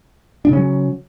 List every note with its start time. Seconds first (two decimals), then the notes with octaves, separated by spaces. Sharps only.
0.45 D4
0.49 C#3
0.53 C#4
0.57 F#3